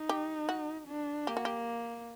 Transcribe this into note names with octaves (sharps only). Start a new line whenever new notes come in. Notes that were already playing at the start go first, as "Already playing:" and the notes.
Already playing: D#4
G4
F#4
D4
A#3 G4
F#4
G4